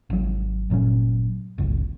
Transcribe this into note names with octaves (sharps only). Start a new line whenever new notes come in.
G#1 F#3
G1 A#2 F#3 C#4
G1 C#2